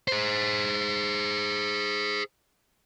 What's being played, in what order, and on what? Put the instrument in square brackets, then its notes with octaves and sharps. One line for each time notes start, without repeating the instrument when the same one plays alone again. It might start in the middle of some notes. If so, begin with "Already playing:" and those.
[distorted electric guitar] G#4 C5